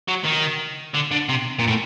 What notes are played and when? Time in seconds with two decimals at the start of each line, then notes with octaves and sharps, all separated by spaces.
0.08 F#3
0.25 D#3
0.94 D3
1.11 D3
1.29 C3
1.59 A#2
1.68 A2